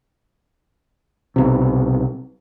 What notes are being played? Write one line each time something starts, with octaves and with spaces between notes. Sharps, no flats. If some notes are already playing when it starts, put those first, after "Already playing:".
B1 C3